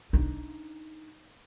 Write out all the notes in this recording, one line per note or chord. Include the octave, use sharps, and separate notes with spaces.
D4 D#4